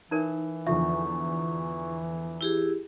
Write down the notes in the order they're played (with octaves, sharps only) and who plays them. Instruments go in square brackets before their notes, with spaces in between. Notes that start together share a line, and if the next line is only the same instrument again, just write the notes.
[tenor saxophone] E3 [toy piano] D#4 A#4 C#5
[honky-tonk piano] E2 D3 F3 [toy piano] E5 [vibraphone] C#6
[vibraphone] E4 G4 G#4